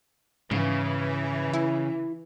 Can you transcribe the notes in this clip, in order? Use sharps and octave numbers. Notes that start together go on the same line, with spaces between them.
G#2 C#3 E3
E4